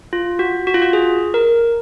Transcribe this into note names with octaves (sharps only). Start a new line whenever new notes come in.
F4
F#4
F#4
F4
F#4
G#4
A#4